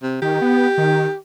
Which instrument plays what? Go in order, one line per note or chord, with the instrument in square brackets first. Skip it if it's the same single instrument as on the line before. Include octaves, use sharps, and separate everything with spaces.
[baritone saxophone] C3
[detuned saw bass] D#3 [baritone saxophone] G4
[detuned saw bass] B3
D#3